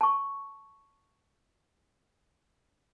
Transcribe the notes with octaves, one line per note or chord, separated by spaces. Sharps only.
A5 C#6